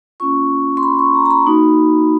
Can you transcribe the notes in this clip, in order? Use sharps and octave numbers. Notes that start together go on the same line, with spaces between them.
A#3 C#4 F4 C#6
C6
B5
C#6
A#5
A#5
B5
A#3 D#4 F#4